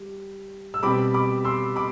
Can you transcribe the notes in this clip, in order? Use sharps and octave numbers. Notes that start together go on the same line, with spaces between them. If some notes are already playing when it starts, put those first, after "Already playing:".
Already playing: G3
E6
B2 G3 C4 B5 D6
B5 D6
C6 E6
B5 D6